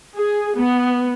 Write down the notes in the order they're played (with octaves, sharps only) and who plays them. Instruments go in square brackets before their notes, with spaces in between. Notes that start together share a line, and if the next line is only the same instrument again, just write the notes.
[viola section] G#4
B3